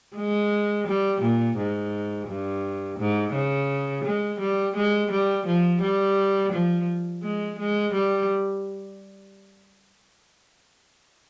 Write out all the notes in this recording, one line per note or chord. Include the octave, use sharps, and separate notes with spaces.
G#3
G3
A#2
G#2
G2
G#2
C#3
G#3
G3
G#3
G3
F3
G3
F3
G#3
G#3
G3